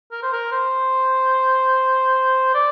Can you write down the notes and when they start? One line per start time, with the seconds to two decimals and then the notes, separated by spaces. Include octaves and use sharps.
0.11 A#4
0.22 C5
0.33 A#4
0.52 C5
2.54 D5